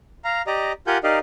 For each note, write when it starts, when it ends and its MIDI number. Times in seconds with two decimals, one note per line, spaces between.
0.24 0.42 77
0.24 0.42 82
0.47 0.72 67
0.47 0.72 74
0.47 0.72 75
0.47 0.72 82
0.87 0.98 65
0.87 0.98 67
0.87 0.98 70
0.87 0.98 78
0.87 0.98 80
0.87 0.98 91
1.04 1.19 63
1.04 1.19 67
1.04 1.19 70
1.04 1.19 74
1.04 1.19 75
1.04 1.19 77